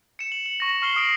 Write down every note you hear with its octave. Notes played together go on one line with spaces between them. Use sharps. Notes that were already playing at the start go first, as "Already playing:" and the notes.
C#7 E7
F#7
F#7
C#6 A#6
C#6 F6 C7 F#7 G7
D#6 D7